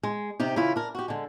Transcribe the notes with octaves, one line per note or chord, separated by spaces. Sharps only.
G#3
C3 D#4 G4
C#3 E3 E4 F4
D4 A#4
F#4 G4
D3 G#3